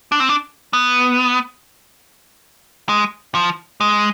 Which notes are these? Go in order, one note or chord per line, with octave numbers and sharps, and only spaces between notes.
D4
C4
D4
B3
G#3
F3
G#3